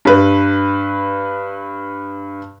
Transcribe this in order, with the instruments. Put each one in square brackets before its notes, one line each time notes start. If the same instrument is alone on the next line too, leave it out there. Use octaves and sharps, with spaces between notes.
[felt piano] G2 B4